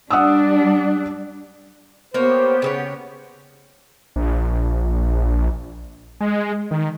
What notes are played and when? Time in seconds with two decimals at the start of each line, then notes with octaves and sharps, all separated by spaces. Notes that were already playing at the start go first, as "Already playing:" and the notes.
0.11 G3 D4 F#5 D#6 E6
2.14 A#3 B3 G4 C5 C#5
2.62 C#3 A4 C#5
4.16 A#1
6.21 G#3
6.71 D#3